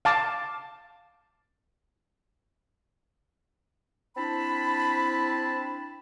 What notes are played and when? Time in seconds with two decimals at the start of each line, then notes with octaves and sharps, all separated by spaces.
0.05 F5 A5 D6
4.17 C4 D4 E4 A5 B5